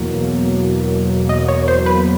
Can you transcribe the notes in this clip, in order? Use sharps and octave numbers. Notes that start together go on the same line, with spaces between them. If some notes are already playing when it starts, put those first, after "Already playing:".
Already playing: E2 B2 F#3 A#3
D#5
C#5
C5
B4